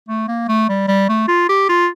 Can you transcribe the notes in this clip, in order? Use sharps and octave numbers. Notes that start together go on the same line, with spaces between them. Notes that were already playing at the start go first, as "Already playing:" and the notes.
A3
A#3
A3
G3
G3
A3
F4
G4
F4